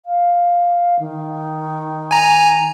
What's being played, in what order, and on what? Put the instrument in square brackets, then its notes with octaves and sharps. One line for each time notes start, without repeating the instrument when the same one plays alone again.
[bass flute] F5
D#3
[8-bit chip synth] G#5 A#5